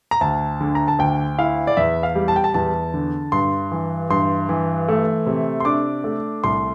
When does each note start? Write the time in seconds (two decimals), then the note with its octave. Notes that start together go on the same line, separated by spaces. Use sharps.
0.11 A#5
0.21 D2 A5
0.61 D3
0.75 A#5
0.88 A5
0.99 D2 G5
1.39 E4 F5
1.67 D5
1.77 E2 E5
2.03 F5
2.15 G3
2.28 A5
2.36 G5
2.44 A5
2.54 E2 A5
2.94 D3
3.32 G2 C6
3.72 E3
4.10 G2 C6
4.49 E3
4.88 A3
5.27 C3
5.60 C6
5.65 D4 D6
6.04 A3
6.44 C2 C6